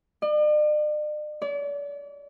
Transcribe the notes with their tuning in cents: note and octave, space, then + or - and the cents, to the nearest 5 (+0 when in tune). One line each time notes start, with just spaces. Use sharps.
D5 +45
D5 -40